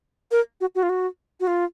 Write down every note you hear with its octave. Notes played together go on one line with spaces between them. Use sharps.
A#4
F#4
F#4
F4
F#4
F#4
F4